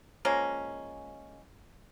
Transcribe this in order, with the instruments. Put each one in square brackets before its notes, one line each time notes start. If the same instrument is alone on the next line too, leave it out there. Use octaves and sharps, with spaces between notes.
[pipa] F3 G#3 A#3 C#4